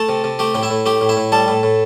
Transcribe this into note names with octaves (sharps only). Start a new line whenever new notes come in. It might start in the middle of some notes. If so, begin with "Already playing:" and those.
Already playing: A3 A4 A5
C3
C3
A3 G4 G5
A2 G5
E4 E5
A2
A3 G4 G5
A2
E4 E5
A2
G3 A4 A5
A2
A2